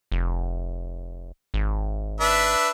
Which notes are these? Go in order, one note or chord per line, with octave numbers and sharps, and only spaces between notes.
F1
G#1
D4 B4 E5